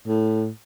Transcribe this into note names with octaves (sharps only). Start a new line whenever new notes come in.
A2